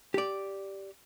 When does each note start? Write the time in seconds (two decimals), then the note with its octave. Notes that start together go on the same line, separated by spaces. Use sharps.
0.14 G4 D5